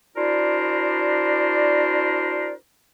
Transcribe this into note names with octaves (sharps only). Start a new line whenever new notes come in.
D4 E4 F#4 A#4 C5 D5